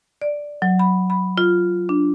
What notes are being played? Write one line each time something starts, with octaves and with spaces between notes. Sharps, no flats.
D5
F#3
B5
B5
F4
D4